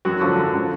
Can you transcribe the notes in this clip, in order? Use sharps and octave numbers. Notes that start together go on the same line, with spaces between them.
F#2 F#3 F#4
D3 F3
F#2
D3 F3